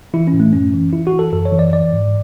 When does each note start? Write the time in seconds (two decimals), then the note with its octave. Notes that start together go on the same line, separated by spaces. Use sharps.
0.14 E3 E4
0.28 C#4
0.33 A2
0.40 A3
0.53 F#2 C#4
0.74 E3
0.93 E3 E4
1.07 F#4
1.13 E3
1.19 A4
1.33 F#2 A4
1.45 C#5
1.52 E3
1.59 D5
1.73 E3 D5
1.93 G#2